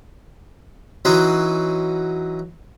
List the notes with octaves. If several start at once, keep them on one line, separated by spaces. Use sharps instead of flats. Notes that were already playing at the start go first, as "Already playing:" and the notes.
E3 F#3 C#4 D#4 F#4 C6